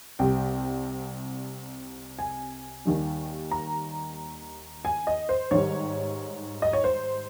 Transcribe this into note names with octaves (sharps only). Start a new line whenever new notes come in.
C2 C3 G3 G5
G#5
D#2 D#3 G3
A#5
G#5
D#5
C5
G#2 D#3 G3 C#5
D#5
C#5
C5